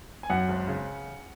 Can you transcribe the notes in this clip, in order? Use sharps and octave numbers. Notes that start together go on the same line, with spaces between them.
G#5
F#2 F#5
G#1
C#3